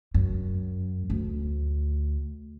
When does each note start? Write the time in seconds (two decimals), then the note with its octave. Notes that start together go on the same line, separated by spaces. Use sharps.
0.14 F#2
1.10 D2